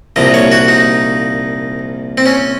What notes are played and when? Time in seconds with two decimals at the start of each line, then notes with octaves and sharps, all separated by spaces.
0.16 C2 A#2 F3 D#5
0.34 C#5
0.52 F#4
0.68 D#4
2.18 C4
2.26 C#4